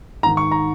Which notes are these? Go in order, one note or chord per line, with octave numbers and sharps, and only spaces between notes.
G#2 D#3 A#5
C#6
A#5